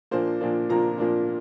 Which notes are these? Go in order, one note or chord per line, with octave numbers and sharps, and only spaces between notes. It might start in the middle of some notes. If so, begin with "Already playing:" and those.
A#2 F3 A#3 D4 C5
A#2 F3 A#3 D4
A#2 F3 A#3 D4 A#5
A#2 F3 A#3 D4